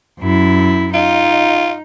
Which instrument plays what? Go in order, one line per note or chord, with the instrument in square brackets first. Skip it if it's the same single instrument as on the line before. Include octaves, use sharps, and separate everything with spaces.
[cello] F#2 E4
[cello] D#4 [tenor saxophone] F4